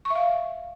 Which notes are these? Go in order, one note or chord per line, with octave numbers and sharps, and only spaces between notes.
C#6
E5
F5